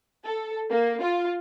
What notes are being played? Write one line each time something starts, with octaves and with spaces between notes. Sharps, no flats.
A4
A#3
F4